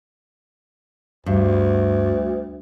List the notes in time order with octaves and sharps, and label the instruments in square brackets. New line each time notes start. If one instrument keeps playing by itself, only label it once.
[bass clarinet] D2 [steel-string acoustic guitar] G2